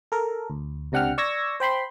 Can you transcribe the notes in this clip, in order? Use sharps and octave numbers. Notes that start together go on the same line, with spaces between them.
A4 A#4
D2
C#2 C3 D4 F#5 G5 F6
D5 C#6 E6 G#6 A#6
C5 G5 B5 C6